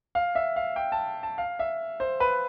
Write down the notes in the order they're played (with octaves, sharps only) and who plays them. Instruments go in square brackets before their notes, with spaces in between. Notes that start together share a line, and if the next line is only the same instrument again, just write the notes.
[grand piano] F5
E5
F5
G5
A5
A5
F5
E5
C5
B4